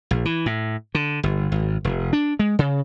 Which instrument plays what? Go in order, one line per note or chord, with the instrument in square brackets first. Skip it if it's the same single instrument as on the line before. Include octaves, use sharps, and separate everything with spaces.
[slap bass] A#1
E3
A2
D3
G1
G#1
F1
D4
G#3
C#3